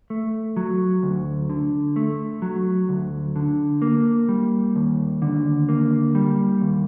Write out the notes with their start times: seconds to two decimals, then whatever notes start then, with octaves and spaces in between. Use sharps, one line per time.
0.10 A3
0.57 F#3
1.03 D2
1.49 D3
1.96 A3
2.42 F#3
2.89 D2
3.36 D3
3.82 A#3
4.29 G3
4.76 D#2
5.22 D3
5.69 A#3
6.15 G3
6.61 D#2